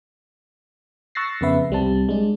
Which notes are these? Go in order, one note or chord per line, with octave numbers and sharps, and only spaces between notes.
C#6 E6 F#6 A6 A#6 C7
F2 C#3 B3 B4 E5
C2 G3 C4 A5
G#3 D4